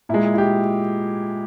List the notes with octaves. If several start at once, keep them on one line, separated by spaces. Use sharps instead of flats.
A#2 G#3 E4
E4
G4